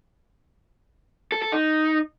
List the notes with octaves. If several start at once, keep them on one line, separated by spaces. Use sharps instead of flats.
A4
A4
D#4